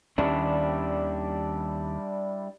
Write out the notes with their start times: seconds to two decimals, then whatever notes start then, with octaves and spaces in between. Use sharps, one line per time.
0.18 D#2 D#3 G3 C#4 D4 E4